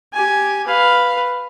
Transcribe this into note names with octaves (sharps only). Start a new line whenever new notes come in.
G4 G#5
B4 F5